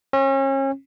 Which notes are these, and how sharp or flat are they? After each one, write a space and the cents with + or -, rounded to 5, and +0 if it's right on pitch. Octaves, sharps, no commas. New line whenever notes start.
C#4 -35